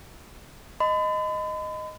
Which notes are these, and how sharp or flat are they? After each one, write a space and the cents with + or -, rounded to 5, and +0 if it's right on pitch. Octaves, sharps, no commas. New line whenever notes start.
D#5 +0 B5 +45